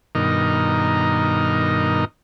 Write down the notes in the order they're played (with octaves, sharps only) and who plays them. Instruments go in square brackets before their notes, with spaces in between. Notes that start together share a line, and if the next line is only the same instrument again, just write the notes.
[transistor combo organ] G2 B2 D#3 D#4 A#4 D#5